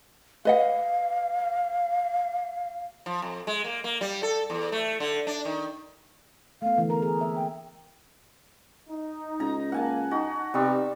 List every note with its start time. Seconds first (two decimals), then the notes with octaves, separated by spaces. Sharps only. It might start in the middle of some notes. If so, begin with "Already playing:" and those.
0.45 B4 D#5 F5 F#5
3.06 F3
3.22 F2
3.47 G#3
3.64 A#3
3.84 A#3
4.01 G3
4.23 A4
4.50 E2
4.72 A3
5.00 D3
5.27 D4
5.45 D#3
6.62 A3 B3 F5
6.78 D3 E3 A3
6.90 B3 A#4 A#5
7.02 G#4
7.20 A#3 E5
7.36 G5
8.88 D#4
9.40 C#2 A#5
9.72 A#3 F#5 G#5 A5
10.11 D#4 F#4
10.54 C3 G3 B3 D#4 C#6 E6